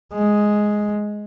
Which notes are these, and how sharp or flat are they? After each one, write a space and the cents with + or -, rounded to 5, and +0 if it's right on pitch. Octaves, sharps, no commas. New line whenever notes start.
G#3 +5